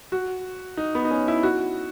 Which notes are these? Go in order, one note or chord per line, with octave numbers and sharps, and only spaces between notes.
F#4
D#4
B3
D#4
C#4
E4
F#4